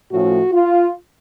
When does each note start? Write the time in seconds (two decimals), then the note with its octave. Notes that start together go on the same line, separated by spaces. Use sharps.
0.10 A2 F3 A3 C#4 F#4
0.52 F4